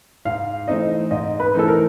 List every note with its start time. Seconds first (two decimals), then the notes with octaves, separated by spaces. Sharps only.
0.25 G#2 F5
0.68 E3 A3 C4 D#4 D#5
1.11 G#2 D#5
1.40 B4
1.54 E3 A3 C4 D#4 A4
1.68 A#4